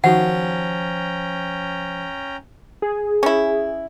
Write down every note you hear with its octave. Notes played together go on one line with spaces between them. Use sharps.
D#3 F3 C#4 F#4 F#5 G5 A#5
G#4
C#4 E4